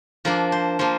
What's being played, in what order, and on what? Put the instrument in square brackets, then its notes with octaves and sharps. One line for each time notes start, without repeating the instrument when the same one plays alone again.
[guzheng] F3 A#3 D4 A#4
C5
F3 A#3 C5